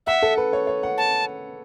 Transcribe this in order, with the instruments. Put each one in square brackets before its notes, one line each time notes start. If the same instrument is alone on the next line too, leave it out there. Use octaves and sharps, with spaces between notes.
[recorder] E5 [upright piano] F#5
[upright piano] A4
B4
C#5
C#5
F#5
[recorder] A5